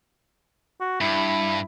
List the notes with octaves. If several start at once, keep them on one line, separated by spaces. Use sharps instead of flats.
F#4
G2 E4